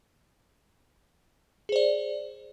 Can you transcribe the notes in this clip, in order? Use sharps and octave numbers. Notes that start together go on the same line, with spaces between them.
G#4 C5 D5